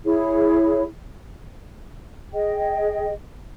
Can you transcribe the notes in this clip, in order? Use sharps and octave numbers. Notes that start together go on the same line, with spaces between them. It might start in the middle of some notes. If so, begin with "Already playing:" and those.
E4 G#4 C#5
G#4 D#5 G5